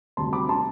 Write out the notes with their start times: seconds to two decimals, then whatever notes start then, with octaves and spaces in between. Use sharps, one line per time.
0.17 D2 C3 G3 A5 C6
0.33 B5 D6
0.49 A5 C6